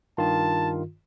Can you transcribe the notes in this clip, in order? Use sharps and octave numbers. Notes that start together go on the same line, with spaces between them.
G2 D#3 F4 A5